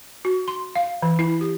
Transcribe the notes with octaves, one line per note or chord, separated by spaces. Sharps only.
F#4
C6
F5
E3
E4
G4